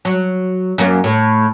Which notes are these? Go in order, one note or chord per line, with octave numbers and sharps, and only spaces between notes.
F#3
F#2 A#3
A2